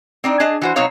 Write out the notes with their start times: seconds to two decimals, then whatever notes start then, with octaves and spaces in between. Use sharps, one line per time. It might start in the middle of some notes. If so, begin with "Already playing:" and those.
0.24 C4 D4 D#4
0.40 D4 G#4 D#5 A5
0.62 E3 F#4 C5
0.76 B2 F#3 C4 D#4 C#5 F5